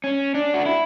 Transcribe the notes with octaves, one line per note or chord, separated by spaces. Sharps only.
C#4
D4
F#4
E4